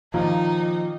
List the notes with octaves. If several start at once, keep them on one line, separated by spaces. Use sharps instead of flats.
A#2 D#3 F3 A#3 D#4